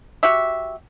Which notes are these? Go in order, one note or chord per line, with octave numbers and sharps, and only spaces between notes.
F#4 G4 E5